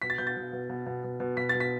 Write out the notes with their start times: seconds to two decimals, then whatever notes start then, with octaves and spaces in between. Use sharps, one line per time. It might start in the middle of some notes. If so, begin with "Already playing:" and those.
0.02 B2 B6
0.10 A6
0.18 B2 G6
0.27 A6
0.37 B2
0.53 B2
0.70 B2
0.86 B2
1.04 B2
1.20 B2
1.37 B2 B6
1.49 A6
1.55 B2
1.60 B6